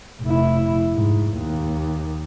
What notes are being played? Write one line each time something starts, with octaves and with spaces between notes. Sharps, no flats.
F1 E4
G#2
D#2